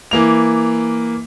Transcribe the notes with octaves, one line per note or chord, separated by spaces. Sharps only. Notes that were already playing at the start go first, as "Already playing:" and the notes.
E3 A#3 F7